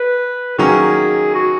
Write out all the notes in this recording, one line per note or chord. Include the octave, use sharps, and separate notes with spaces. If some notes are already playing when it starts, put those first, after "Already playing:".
Already playing: B4
D#3 F#3 A#3 C#4 G#4
F#4